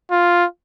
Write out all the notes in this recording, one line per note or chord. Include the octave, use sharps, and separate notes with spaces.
F4